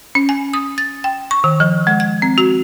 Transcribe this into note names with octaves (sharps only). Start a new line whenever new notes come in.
C#4
G#5
D#6
A6
G5
C#6
D#3
F3
G#3
G#6
C4
F#4